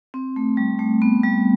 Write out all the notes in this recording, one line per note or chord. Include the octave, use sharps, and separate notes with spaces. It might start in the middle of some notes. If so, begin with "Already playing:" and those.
C4
A3
G3
A3
B3
G3